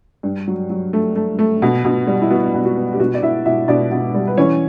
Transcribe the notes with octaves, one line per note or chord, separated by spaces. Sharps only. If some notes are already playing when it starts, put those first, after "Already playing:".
G2
F#3
F#3
A3
A3
A3
B2
B2
G3
E4
B3 F#4
B2
F#4
B3
G4
B2 F#4
D5
B2 E4 E5
B2 E4 E5
B2 D4 D5
B2
G3
B4
E3 C#4 C#5